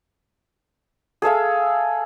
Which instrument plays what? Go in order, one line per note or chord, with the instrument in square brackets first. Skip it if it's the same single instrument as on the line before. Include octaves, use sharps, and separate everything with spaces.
[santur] G#4 A4 E5 F5